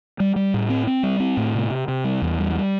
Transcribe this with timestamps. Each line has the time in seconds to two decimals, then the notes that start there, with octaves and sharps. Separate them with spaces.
0.20 G3
0.36 G3
0.54 A2
0.70 C4
0.87 C4
1.03 G3
1.20 C4
1.37 A2
1.55 C3
1.70 C3
1.88 C3
2.04 G3
2.22 E2
2.39 G3
2.55 G3